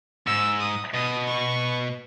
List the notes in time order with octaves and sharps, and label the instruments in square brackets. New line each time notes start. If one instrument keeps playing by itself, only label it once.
[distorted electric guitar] G#2 [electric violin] E6
[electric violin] D#6
[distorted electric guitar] B2 [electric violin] D#6
[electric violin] C#6